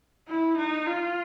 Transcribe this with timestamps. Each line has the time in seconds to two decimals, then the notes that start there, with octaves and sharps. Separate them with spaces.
0.29 E4
0.57 D#4
0.87 F4